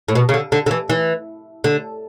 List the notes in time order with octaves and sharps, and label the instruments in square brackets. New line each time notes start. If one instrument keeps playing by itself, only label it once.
[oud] A2
B2
C#3
D3
D3
D3
E3
E3
D3